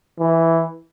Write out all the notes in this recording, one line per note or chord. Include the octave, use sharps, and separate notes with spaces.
E3